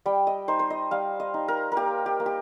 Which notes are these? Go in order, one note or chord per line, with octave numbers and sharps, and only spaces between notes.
G3 G5
D#5
D#4 C5
C5
D#5
G3 F5
D#5
D#4
A#4
A#4
A#3 G4
G4
A#3
G4